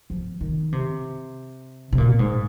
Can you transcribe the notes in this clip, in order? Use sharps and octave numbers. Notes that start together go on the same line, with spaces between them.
F3
D#3
C3
C3
A#2
G#2